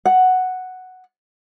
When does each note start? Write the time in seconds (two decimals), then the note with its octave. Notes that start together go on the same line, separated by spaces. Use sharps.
0.06 F#5